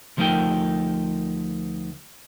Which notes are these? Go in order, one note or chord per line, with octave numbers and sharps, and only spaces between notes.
D2 F3 A3 D#4 A#4 G5